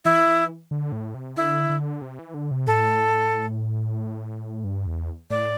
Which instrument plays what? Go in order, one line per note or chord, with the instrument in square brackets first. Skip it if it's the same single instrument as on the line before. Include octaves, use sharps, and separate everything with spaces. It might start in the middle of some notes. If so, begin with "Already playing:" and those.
[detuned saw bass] E3 [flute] E4
[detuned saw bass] E3
D3
A2
C3
[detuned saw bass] D3 [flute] E4
[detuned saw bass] D3
C3
E3
D3
C3
[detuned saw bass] A2 [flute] A4
[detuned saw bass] G2
E2
[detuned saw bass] A2 [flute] D5